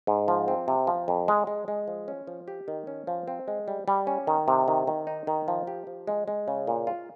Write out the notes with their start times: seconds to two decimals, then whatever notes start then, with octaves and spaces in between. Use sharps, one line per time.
0.07 G#2
0.28 F3
0.48 C4
0.68 C3
0.87 F3
1.08 F2
1.28 G#3
1.47 G#3
1.68 G#3
1.88 F3
2.08 C#4
2.27 F3
2.48 G4
2.68 D#3
2.87 C#4
3.07 F3
3.28 C4
3.48 G#3
3.68 G3
3.88 G3
4.07 C#4
4.27 D#3
4.48 C3
4.68 D#3
4.87 D#3
5.07 D#4
5.27 D#3
5.48 F3
5.67 G4
5.87 F3
6.07 G#3
6.28 G#3
6.48 C#3
6.67 A#2
6.87 F4